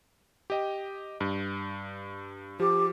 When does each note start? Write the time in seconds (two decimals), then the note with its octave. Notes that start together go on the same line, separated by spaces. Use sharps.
0.50 G4 D#5 G5
1.21 G2
2.60 F3 G4